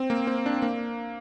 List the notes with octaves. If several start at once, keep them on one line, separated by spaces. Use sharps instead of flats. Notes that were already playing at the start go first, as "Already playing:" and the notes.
Already playing: C4
A#3
C4
D4
A#3